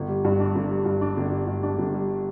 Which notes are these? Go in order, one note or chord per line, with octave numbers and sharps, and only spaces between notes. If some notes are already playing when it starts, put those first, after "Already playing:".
Already playing: G1
G3
G2
D4
G1
G3
G2
D4
G1
G3
G2
D4
G1
G3